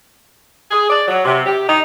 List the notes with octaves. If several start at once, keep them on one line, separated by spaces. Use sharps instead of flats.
G#4
D5
F#3
C3
G4
D#4